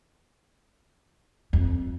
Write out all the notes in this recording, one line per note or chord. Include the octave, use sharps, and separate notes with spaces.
F2